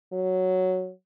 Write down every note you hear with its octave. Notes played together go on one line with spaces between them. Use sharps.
F#3